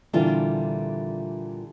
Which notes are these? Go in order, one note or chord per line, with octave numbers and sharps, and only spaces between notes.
A#2 D3 E3 G3 B3 D4 F4